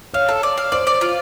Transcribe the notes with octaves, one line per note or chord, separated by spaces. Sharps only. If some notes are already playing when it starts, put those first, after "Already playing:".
C#5 F5
A4
D5
F5
C5 D5
D5
F4